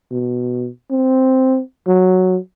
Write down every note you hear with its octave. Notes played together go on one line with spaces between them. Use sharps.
B2
C4
F#3